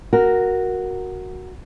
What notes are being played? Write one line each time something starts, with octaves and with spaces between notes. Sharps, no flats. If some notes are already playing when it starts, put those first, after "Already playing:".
F#4 A#4